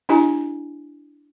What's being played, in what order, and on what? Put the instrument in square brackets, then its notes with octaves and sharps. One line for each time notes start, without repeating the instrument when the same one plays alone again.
[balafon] D4 E4 G4 D#5 G#5 A#5